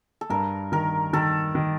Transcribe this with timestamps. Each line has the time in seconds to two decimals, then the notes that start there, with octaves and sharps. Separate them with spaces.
0.21 A4
0.30 G2 A#4
0.72 D#3 A#4
1.13 D#3 A4
1.55 D#3